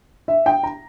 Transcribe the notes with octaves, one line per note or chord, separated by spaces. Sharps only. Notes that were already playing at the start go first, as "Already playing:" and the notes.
E5
G5
A#5